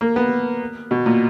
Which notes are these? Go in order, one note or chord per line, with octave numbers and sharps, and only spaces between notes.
A#3
B3
B2
A#2